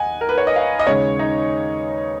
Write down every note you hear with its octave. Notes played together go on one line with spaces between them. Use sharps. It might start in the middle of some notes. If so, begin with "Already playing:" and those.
Already playing: D#2 D#5 F#5 G#5
A#4
B4
C#5
D#5
F5
D#5
D#2 C#3 G#3 C#5
D#4